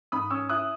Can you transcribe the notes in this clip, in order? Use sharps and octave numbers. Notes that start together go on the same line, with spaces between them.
G#2 B5 D#6
C#4 C#6 E6
E4 D#6 F#6